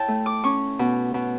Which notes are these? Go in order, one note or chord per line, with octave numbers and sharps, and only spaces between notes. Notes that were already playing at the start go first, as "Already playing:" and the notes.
Already playing: E4 C#5 G5 A5
A3
D6
C#4 C#6
B2
B2